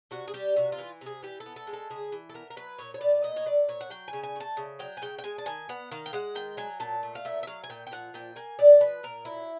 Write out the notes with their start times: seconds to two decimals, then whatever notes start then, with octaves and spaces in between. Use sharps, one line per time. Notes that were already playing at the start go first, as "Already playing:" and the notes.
0.11 C3 F#4
0.28 G#4
0.34 G3 G4
0.56 C3 F#4
0.72 F4
0.78 E3
1.01 C3 G#4
1.22 E3 G4
1.40 A4
1.46 B3
1.56 A4
1.67 G#3
1.73 A4
1.90 C#3 G#4
2.12 E3
2.29 A4
2.34 B3 A#4
2.50 A#4
2.57 F#3 B4
2.78 A#2 C#5
2.94 C#5
3.01 B3 D5
3.23 A#2 D#5
3.36 C#5
3.46 F#3 D5
3.69 A#2 C#5
3.81 F#5
3.90 F#3 G5
4.08 G#5
4.13 C#3
4.23 G#5
4.36 A3 A5
4.57 C#3
4.79 F#3 G5
4.97 G#5
5.02 C#3 G5
5.18 G5
5.24 G#3 G#5
5.38 A5
5.46 D#3 G#5
5.69 B3 F#5
5.92 D#3 F5
6.06 G5
6.13 G#3 F#5
6.35 D#3 G5
6.57 F#3 G#5
6.80 A#2 A5
7.03 A3
7.15 F5
7.25 A#2 E5
7.43 E5
7.47 F#3 F5
7.64 G#5
7.70 A#2 G5
7.87 G5
7.92 F3 F#5
8.14 A#2 G5
8.36 A#3 G#5
8.59 A#2 D5
8.81 F3 B4
9.03 A#2 A#4
9.25 F#3 E4